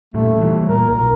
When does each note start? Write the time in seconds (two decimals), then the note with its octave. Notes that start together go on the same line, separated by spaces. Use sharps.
0.14 A#2 G3 A3
0.38 E3 F3 G3
0.69 A#2 A#4
0.90 B1 A#4